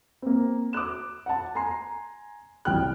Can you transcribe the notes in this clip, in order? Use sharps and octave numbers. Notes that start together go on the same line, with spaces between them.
A#3 C4
D6 D#6 F#6 E7
F#5 A5
G#5 A#5 C6 C7
C2 G5 F6 F#6